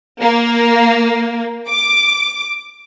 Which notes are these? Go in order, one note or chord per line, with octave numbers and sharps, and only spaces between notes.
A#3
D6